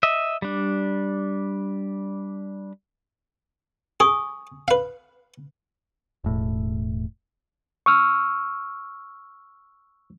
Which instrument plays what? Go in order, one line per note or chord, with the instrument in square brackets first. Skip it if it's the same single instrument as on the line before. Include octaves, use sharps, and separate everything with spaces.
[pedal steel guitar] D#5 E5
G3 D4
[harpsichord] G#4 [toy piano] G#5 C#6 D#6
[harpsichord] B4 F5
[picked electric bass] E1 A2
[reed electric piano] C#6 E6 F6